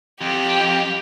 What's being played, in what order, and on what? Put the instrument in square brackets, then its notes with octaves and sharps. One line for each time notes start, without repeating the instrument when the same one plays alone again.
[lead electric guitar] F2 [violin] G4